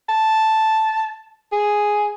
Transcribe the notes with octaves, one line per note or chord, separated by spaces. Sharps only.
A5
G#4